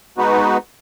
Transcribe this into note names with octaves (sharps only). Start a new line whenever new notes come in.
G#3 B3 D#4 F#4 B4